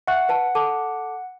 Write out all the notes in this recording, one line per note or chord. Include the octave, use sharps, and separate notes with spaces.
E5 F#5 C#6 F#6
B4 A5
A4 A5 D6